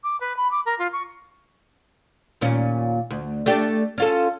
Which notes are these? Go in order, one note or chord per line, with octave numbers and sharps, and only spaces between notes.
D6
B4
B5
D6
A#4
F4
C#6
D#2 A#2 C#4
D2
A3 D4 G4
C#4 F4 A4